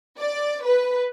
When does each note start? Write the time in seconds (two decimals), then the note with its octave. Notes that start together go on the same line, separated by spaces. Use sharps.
0.18 D5
0.64 B4